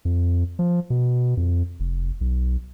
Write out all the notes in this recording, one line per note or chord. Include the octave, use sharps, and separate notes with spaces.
F2
F3
B2
F2
F1
B1